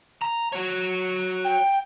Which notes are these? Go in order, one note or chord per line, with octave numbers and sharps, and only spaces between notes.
A#5
F#4 C#5
G5